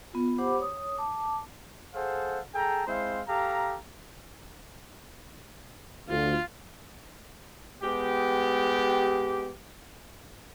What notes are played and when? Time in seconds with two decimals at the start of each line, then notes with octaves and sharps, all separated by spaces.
0.13 B3 F4
0.38 G4 C5 F#5 B5 D6
0.60 C#5 D#6
0.98 A5 D6
1.94 G#4 A4 C5 F5 F#5
2.55 G#4 A4 G5 A5 A#5
2.87 G#3 C4 E4 C5 F5
3.29 G4 A4 F5 A#5
6.09 D2 F4
7.82 G#3 B3 G4